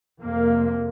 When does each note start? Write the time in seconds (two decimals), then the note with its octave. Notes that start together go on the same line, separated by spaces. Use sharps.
0.21 F2 C3 A#3